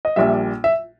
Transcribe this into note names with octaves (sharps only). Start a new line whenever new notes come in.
D#5
A#1 A#2 G3 E5
E5